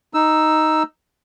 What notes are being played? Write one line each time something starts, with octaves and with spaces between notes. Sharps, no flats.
D#4 E6